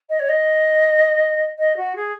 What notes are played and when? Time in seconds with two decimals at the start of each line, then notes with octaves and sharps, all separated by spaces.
0.09 D#5
0.19 C#5
0.28 D#5
1.58 D#5
1.76 F#4
1.95 G#4